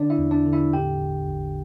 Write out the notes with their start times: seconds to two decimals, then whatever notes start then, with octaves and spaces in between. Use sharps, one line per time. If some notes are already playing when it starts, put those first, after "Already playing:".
Already playing: D3 D4 D5
0.10 E4 E5
0.18 E2
0.31 D4 D5
0.46 D3
0.53 E4 E5
0.73 A2 G4 G5
1.01 A1
1.29 A1